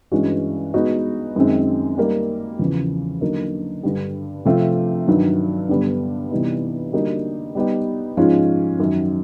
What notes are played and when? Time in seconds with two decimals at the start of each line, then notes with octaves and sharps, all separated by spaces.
0.12 G2 E3 G#3 C#4 F#4
0.74 G#3 B3 D#4 F#4
1.36 F#2 D#3 G#3 C4
1.98 G3 A#3 D#4
2.59 E2 C#3 F3
3.21 D3 F#3 A#3 D#4 F#4
3.83 G2 D3 G3
4.45 C3 F3 A3 C4 F4
5.07 G2 D#3 F#3
5.69 G2 D3 G3 B3
6.31 C3 E3 G3 B3 D#4
6.93 D3 G3 A#3 D#4 F#4
7.55 G3 B3 D#4 G4
8.17 G#2 F3 G#3 C#4 F4
8.79 F#2 D#3 F#3